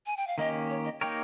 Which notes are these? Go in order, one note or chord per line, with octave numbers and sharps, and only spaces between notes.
G#5
G5
F5
D#3 A#3 C#4 G4 D#5
C#5
D#5
A#3 D#4 G4 A#4 C#5 G5